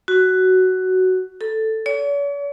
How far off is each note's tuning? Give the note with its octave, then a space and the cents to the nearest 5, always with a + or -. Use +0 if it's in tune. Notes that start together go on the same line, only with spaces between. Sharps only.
F#4 +10
A4 +5
C#5 +45